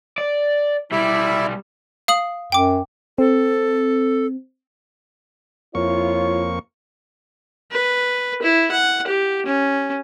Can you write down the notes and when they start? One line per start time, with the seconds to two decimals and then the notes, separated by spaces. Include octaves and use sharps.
0.18 D5
0.92 B1 G3 E4 D5 E5
2.08 F5 D#6 F#7
2.52 F#2 G5 D6
3.18 C4 A4
5.75 F2 A#3 E4 F4 C#5 C#6
7.72 B4
8.42 E4
8.71 F#5
9.07 G4
9.46 C#4